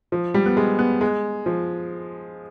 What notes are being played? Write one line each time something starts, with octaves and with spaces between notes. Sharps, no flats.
F3
G3
B3
G#3
B3
G#3
F3